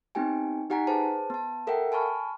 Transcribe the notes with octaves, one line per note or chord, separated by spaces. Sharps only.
B3 C4 D#4 G4 G5 G#5
D#4 G4 F#5 G#5 A#5 B6
G#4 B4 C5 A5
B3 A5
A4 A#4 E5 F#5 G5
G#5 A5 B5 C#6 F6